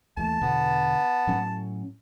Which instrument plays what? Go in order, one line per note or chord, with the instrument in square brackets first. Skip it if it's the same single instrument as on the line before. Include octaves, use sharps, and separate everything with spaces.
[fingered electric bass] D#2 E3 A3 [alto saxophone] A5
[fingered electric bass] E2 B2 D3 [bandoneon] B3
[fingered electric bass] A2 F#3 C#4